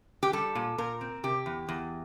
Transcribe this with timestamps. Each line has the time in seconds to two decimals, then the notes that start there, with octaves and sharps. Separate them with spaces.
0.23 G4
0.33 G3 A4
0.55 A#2
0.78 A#2 A#4
1.01 C4
1.24 C3 G4
1.46 E2
1.69 E2